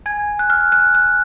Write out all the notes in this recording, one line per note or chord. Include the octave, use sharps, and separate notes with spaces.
G#5 G#6
F#6
F6
F#6
F#6